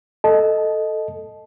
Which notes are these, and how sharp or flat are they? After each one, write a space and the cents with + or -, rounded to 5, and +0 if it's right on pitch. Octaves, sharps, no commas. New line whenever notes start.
A4 +0 D#5 +0 A5 -20